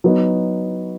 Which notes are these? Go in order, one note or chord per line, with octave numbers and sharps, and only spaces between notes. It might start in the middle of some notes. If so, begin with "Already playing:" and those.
F#3 B3 D#4